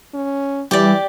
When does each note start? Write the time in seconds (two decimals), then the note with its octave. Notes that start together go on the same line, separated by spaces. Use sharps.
0.14 C#4
0.71 E3 G3 G4 D5